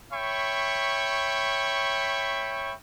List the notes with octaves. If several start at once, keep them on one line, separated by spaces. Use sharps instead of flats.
C#5 E5 G5 B5 C#6